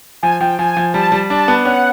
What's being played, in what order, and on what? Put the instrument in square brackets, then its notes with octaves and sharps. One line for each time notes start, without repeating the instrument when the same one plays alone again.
[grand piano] F3 [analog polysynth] G#5
[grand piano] F3 [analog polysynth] G5
[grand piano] F3 [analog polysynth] G#5
[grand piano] F3
[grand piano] G3 [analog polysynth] A5
[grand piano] G3
[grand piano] D4 [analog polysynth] A5
[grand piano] B3
[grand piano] C#4 [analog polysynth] F#5